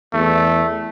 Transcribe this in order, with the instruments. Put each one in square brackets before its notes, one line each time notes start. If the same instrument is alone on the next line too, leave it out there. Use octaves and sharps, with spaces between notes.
[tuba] E2 [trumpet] A3